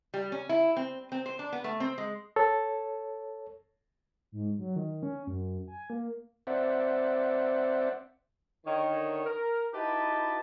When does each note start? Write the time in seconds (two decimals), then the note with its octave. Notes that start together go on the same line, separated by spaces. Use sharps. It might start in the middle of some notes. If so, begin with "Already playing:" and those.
0.14 G3
0.32 C#4
0.49 E4
0.77 C4
1.12 C4
1.26 C5
1.39 D4
1.52 B3
1.64 A3
1.80 C4
1.98 G#3
2.36 A4 C#5
4.32 G#2
4.59 F#3
4.76 D#3
5.03 C#4
5.27 F#2
5.68 G#5
5.90 A#3
6.47 C4 C5 D5 E5 F#5
8.66 D3 D#3 C#5
9.25 A#4
9.74 D#4 E4 F#4 G4 B4 A5